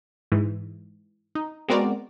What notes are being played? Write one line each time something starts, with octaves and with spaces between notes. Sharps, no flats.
G#2 E3
D#4
G#3 B3 C4 F#4 A#4 D5